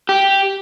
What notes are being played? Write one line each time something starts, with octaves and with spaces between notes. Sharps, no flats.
G4